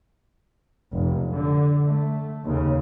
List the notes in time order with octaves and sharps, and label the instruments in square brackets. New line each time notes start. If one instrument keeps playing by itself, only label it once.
[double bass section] F1 B1
D3
A3
D#2 C#3